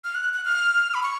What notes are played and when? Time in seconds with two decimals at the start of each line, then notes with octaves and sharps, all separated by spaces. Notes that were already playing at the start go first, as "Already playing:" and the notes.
0.04 F6
0.15 F#6
0.34 F#6
0.45 F6
0.94 B5
1.03 C#6